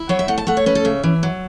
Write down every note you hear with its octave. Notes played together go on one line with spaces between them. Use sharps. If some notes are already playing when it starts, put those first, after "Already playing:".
Already playing: E4
F#3 C#5
E5
A3 F#5
A5
A3 F#5
C#5
C#4 B4
A4
C#3 E5
E3
F#3